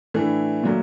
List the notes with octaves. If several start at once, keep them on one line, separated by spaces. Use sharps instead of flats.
A2 E3 A3 D4
A#2 F#3 A3